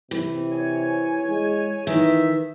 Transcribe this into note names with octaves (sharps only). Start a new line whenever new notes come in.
C3 E3
C#5 G#5
G#3
D#3 E3 E5